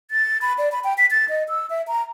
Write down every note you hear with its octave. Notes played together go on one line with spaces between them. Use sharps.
A6
B5
D5
B5
G5
B6
A6
D#5
E6
E5
A#5